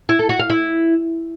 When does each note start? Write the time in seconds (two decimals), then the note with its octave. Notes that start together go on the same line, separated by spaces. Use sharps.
0.09 E4
0.19 A4
0.29 F#4
0.39 F5
0.50 E4